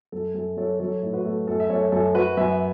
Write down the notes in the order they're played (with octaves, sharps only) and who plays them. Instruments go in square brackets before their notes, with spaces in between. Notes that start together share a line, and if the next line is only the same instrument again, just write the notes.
[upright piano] F#2 A4
F#2 A4
F#2 A4 C#5
F#3 A4 C#5
A2
F#4 B4
A3
F#2 A4
E5
F#2 A4 C#5
F#2 A4
F#2 F#4 B4
F#2 B4 E5